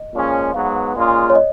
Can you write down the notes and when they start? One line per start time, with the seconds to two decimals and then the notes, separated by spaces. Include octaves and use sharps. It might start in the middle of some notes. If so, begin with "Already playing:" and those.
Already playing: D#5
0.13 A#2 F3 G#3 C#4 G#4
0.54 G#2 F#3 B3 F5
0.94 A#2 G#3 C#4 F4 G#4
1.30 C#5
1.35 D#5